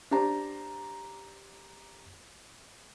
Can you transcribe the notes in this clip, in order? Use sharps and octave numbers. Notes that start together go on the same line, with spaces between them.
D4 G4 C5 A#5